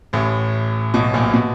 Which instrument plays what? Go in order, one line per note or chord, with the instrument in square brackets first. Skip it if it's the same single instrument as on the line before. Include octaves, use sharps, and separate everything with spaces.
[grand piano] A1 A2
B1 B2
A#1 A#2
B2